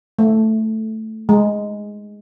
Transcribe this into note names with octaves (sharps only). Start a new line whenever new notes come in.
A3
G#3